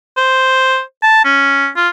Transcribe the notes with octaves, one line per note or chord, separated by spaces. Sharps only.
C5
A5
C#4
F4